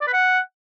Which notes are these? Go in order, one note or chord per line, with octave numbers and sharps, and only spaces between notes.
D5
B4
F#5